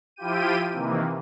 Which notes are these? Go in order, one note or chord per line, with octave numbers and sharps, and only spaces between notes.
F3 E4 F4 G4 G5 D#7
C3 D#3 E3 A#3